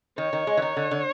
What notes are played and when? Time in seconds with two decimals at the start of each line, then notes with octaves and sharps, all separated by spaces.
0.18 D#3 C#5
0.33 D#3
0.47 G#3
0.57 E3
0.62 D#3
0.77 D3
0.91 D3